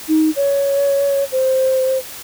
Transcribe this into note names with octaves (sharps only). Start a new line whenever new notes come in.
D#4
C#5
C5